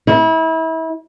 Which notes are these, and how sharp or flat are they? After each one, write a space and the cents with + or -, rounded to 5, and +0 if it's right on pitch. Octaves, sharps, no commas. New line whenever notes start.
E4 -30